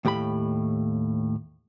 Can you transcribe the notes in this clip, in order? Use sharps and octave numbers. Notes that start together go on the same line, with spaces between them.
D#2 A2 G4 A#5 B5